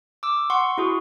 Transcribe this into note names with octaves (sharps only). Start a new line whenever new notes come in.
D6 E6
F#5 C6 C#6
E4 F#4 G#4